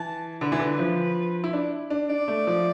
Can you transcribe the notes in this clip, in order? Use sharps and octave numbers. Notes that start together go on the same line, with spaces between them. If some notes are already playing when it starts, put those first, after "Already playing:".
Already playing: E3 A5
D3 B4
E3
D3
F3
E4
D4
D4
D4 D5
A3
F3